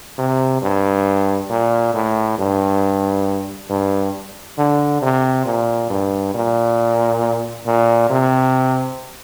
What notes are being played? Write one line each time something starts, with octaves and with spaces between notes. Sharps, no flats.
C3
G2
A#2
A2
G2
G2
D3
C3
A#2
G2
A#2
A#2
C3